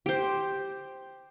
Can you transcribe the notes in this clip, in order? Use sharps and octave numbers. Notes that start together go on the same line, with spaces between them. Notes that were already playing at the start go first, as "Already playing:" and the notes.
G4 C5